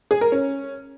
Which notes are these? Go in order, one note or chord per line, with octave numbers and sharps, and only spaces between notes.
G#4
A#4
C#4